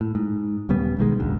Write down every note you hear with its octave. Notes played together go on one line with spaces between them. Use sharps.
A2
G#2
D#1 C#3 G3 B3
B1 D#3 G3 G#3
E1 A1 D2